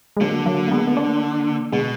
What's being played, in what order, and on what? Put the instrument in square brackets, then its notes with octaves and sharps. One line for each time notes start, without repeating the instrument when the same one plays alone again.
[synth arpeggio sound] G#3
[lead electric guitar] D3 [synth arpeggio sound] F#3 A#3
[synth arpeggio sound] F#3 A#3
A#3
G#3 B3
B3
A#3 D4
[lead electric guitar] B2 [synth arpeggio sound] G#3 B3